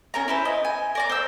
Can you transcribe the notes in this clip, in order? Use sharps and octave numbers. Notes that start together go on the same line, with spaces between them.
C#4 A#4 A#5
E4 B4 C5
D#5
G#5
A#4 D5 A#5
C5 E6